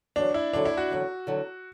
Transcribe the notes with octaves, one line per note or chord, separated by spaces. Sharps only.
E2 D3 F#3 D4
E4
E2 D3 F#3 D4
E4
F#4
E2 D3 F#3
E2 D3 F#3